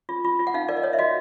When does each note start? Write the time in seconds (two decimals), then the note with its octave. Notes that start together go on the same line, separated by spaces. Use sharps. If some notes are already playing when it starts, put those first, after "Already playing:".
0.09 F4
0.24 F4
0.39 F4
0.47 F#5
0.54 D#4 F5
0.68 A#4 D5
0.77 D#5
0.83 C#5
0.93 E5
0.99 F#4 D#5